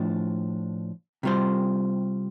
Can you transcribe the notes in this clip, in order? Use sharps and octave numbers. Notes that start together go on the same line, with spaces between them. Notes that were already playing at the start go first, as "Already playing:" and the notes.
Already playing: A2 F3 D4
C3 G3 F4 C5